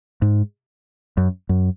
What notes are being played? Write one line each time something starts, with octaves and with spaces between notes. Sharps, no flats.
G#2
F#2
F#2